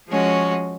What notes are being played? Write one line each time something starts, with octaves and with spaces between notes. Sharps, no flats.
F3 G#3 C#4 F#4